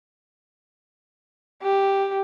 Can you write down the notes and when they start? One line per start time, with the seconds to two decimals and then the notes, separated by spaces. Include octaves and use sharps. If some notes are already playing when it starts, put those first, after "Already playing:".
1.63 G4